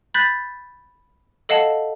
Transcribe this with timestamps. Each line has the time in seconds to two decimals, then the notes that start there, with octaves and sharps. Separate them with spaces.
0.14 B5 F#6 G6 A6 B6
1.49 A4 D#5 F5 F#5 A5